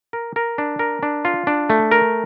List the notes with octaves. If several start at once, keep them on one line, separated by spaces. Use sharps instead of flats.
A#4
A#4
D4
A#4
D4
F4
D4
A3
A#4